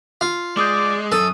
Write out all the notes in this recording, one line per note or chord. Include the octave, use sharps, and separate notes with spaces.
F4
G#3 D5 D6 D#6 G6
F#2 A4 D#6